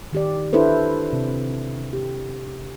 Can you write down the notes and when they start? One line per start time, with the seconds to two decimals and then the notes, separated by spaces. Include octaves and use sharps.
0.13 D#3 G4 D5
0.53 D4 E4 A4 B4 C5
1.13 C3
1.93 G4